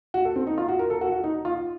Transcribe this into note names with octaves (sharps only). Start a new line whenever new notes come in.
F#4
A4
C4
D#4
F4
F#4
A#4
A4
F#4
F#4
D#4
F4